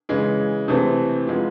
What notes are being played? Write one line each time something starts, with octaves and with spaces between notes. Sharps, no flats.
C#3 E3 G#3
C3 E3 A3 C4
F3 G#3 B3